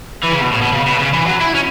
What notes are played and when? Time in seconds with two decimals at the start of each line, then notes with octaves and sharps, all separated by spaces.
0.24 E3
0.32 C#3
0.41 B2
0.52 A2
0.62 B2
0.73 C#3
0.86 B2
1.00 C#3
1.14 E3
1.27 F#3
1.41 E4
1.55 C#4